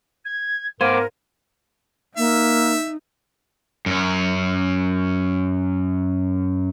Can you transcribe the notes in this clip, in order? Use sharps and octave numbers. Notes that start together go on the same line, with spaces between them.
G#6
G#2 B3 A#4 C5 F5 D6 G#6 D#7
A#3 D#4 E5
F#2 C#4